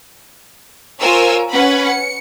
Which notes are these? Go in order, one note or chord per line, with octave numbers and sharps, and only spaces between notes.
F4 A#4 C5 C#5 G#5 E6
C#4 B4 F#5 B5
C#7